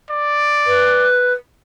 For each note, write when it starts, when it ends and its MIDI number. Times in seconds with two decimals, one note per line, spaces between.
0.10 1.08 74
0.67 1.33 71